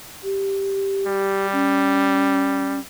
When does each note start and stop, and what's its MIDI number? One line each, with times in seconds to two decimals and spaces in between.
0.23 1.47 67
1.07 2.80 55
1.52 2.79 61